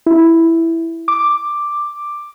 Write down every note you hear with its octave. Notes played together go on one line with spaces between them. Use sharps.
E4
D6